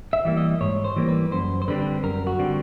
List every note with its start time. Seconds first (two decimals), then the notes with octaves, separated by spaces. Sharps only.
0.13 E5
0.25 E3 G3 A#3
0.37 D#5
0.61 G#2 C#5
0.84 C5
0.96 E3 G3 A#3
1.08 B4
1.32 F#2 C5
1.62 C5
1.68 D3 G3 C4 B4
2.04 F#2 A#4
2.27 F#4
2.39 D3 G3 C4